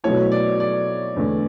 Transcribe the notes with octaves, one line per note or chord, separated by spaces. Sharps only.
B2 F#3 A3 E4 C#5
D5
D5
E2 D3 A3